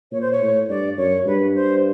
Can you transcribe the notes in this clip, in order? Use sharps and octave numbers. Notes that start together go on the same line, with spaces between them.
A#2 C#5
C5
C#5
A2
G2 D5
F#2 C#5
G2 B4
C5